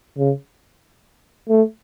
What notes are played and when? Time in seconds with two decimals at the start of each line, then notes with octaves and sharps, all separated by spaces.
0.18 C#3
1.49 A3